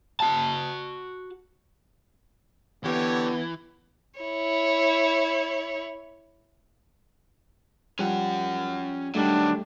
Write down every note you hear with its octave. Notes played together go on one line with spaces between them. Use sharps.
F#4 A5
D3 E3 B3 G4 C#5
E4 C#5
F3 G3 C#4 F#5
D#3 F#3 G3 A3 D4